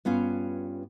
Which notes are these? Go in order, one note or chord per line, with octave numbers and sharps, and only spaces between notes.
G2 B3 C#4 F4